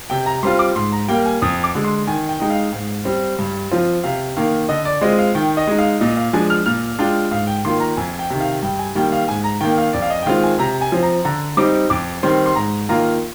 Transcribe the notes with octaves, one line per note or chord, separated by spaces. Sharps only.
C3 G5
A#5
G3 C4 F4 C6
D6
G#2 C6
A#5
G3 A#3 G5
G#5
F2 D#6
D6
D3 G#3
C6
D#3 G#5
G5
G#3 D#4 G5
F5
G#2
G3 C4
G2
F3 C4 F4
C3 F5
D#3 A#3 F5
D3 D#5
D5
G#3 C4 F4 D#5
F5
D#3 G5
D#5
G#3 D#4
F5
A#2 D#5
F5
F3 G#3 D4 G#5
F6
A#2 F6
G#3 D4 F4 G5
G#2 F5
G5
D#3 A#3 F4 C6
A#5
F2 G#5
G5
C3 D#3
F5
G2 G5
G#5
D#3 G3 A#3 G5
F5
G#2 G#5
A#5
D#3 A#3 G5
F5
F2 D5
F5
D#5
G5
D#3 G#3 C4 F4 F5
G#5
C3 A#5
G#5
F3 C4
A#5
D3 A#5
G3 C4 D#4 D6
F2 D6
D#3 G3 C4 C6
C6
G#2 A#5
D#3 A#3 F4 A#5